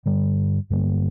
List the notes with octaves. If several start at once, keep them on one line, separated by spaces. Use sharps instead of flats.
G2 D3 G3
G2 D3 G3 A#3